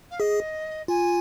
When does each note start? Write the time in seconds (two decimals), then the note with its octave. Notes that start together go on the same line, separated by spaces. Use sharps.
0.10 F5
0.20 G#4 D#5
0.88 F4 G#5